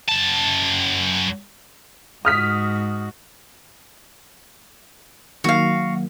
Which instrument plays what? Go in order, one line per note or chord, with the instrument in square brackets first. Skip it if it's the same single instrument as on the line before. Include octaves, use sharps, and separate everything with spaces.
[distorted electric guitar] F#2 A5
[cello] G#2 F#4 [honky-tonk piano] D#6 F6 B6
[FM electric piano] D#3 F#3 A#3 [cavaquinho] F#4 F5